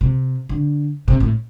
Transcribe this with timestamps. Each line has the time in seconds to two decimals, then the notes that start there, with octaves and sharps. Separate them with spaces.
0.01 C3
0.49 D3
1.08 C3
1.20 A2